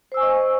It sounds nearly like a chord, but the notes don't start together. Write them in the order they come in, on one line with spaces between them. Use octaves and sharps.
C5 E6 G#5 C#6 D#5